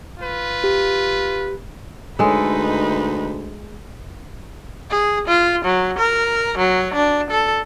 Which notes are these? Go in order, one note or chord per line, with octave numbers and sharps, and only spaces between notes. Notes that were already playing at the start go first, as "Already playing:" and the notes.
F4 B4
G4
D2 G#3 D#4 A4 B4
G#4
F4
F#3
A#4
F#3
D4
A4